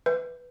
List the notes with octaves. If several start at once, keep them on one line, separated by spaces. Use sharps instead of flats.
B4